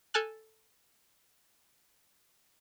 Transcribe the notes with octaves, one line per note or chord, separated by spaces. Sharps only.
A4 G#5 A5 F6 F#6